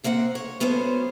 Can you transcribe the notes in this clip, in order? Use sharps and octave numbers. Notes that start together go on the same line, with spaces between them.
C#3 A#3 C4 E5 F#5
C#5
F#2 B3 C#4 A4 C5